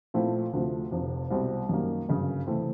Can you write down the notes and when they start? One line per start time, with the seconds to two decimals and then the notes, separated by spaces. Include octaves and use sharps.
0.14 A#2 F3 A3 C4 E4
0.53 D2 C3 F3 A3
0.91 F1 F2 C3
1.30 C2 B2 G3 C4
1.69 F#2 D#3 G3 A#3
2.08 G1 F#2 C#3
2.47 C3 E3 A3 C4